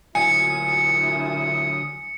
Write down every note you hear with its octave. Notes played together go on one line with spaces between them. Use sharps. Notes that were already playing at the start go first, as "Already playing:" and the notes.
D2 A#2 D3 F#3 E4 G#5 D#6 C#7